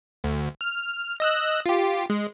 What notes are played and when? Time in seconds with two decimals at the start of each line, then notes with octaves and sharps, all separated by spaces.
0.24 D2
0.61 F6
1.20 D#5 E6 F#6
1.66 F4 G4
2.10 G#3